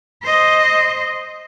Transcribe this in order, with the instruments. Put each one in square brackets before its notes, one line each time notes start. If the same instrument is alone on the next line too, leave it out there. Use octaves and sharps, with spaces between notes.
[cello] C5 D#5